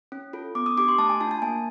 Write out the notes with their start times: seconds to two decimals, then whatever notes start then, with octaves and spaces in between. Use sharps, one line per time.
0.12 C#4
0.33 F4 A4
0.55 B3 D6
0.66 D#6
0.77 D4 G4 D6
0.88 C6
0.98 A3 A5
1.09 G#5
1.20 D4 F4 A5
1.31 A5
1.42 A#3 G#5